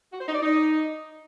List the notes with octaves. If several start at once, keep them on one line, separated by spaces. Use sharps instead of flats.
F#4
C5
D#4
D5
D#4